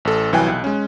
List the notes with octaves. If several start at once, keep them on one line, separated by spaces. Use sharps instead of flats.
A1 A4
C2 E3 F#3 G5 G#5 F#6
B1
G#3 C#4